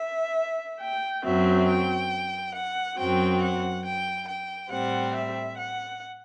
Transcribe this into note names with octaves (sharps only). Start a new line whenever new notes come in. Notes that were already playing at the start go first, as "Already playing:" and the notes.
Already playing: E5
G5
F#2 F#3 C4 E5
G5
F#5
F#2 F#3 C4 G5
F#5
G5
G5
A2 G3 C4 F#5
E5
F#5